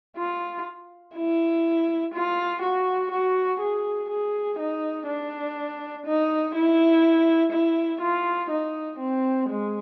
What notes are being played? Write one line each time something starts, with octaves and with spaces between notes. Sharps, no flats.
F4
E4
F4
F#4
F#4
G#4
G#4
D#4
D4
D#4
E4
E4
F4
D#4
C4
G#3